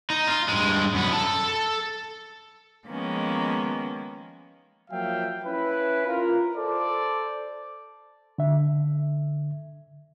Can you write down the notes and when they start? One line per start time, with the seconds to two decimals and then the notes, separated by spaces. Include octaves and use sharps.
0.10 D#4
0.27 F4
0.49 G2 G#3
0.94 F#2 B3
1.13 A4 A5
2.86 D#3 F3 G#3 A#3 B3 C#4
4.91 F3 F#3 A#3 E5 F5 G5
5.44 C#4 E4 B4
6.06 F4 A#4
6.56 A4 C5 D5
8.38 D3 E5